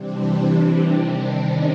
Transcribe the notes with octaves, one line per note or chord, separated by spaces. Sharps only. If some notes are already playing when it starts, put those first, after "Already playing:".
Already playing: C3 E3 G3 C4 D4
C3 D#3 G3
C#4 D#4